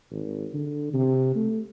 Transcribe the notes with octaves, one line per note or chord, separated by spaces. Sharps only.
G#1
D3
C3
A3